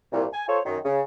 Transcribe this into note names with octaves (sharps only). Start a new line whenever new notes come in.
C2 A#2
G#5
F4 A4 C5 C#5
F#2 D#3
C#3